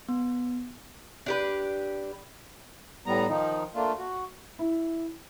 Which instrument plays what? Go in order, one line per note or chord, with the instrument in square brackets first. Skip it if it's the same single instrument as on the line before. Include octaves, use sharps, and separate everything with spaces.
[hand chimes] B3
[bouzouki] D4 G4 B4
[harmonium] A2 G3 B3 A#5
D#3 F3 D#4
A3 A#3 D4 F4
F#4
[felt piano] E4